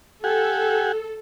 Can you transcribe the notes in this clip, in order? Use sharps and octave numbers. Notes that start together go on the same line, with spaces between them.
G4 A4 F#5 G#5